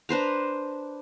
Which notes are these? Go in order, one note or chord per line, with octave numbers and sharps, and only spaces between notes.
D4 B4 C5 A#5